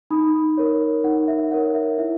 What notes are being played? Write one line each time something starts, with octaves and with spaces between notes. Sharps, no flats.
D#4 B5 D#6
A#4 C#5
D#4 F#5
E5
A#4 C#5 F#5
E5
E4 E5